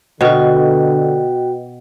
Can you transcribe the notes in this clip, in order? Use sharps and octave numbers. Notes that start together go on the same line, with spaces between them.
B2 D3 F#4 B4 D#5 G5